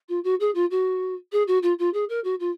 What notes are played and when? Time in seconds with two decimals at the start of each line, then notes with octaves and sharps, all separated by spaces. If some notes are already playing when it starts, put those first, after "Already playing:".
0.09 F4
0.24 F#4
0.40 G#4
0.55 F4
0.71 F#4
1.32 G#4
1.48 F#4
1.63 F4
1.79 F4
1.94 G#4
2.09 A#4
2.24 F#4
2.40 F4